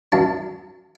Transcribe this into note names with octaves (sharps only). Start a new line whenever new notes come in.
F#2 A5